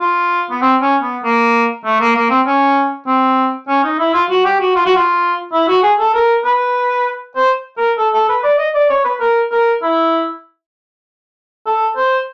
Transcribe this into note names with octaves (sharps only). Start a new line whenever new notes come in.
F4
B3
C4
C#4
B3
A#3
A3
A#3
A#3
C4
C#4
C4
C#4
D#4
E4
F4
F#4
G4
F#4
F4
F#4
F4
E4
F#4
G#4
A4
A#4
B4
C5
A#4
A4
A4
B4
D5
D#5
D5
C#5
B4
A#4
A#4
E4
A4
C5